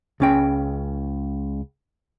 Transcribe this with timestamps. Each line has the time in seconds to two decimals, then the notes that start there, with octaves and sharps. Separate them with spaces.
0.20 C#2 C#4 G5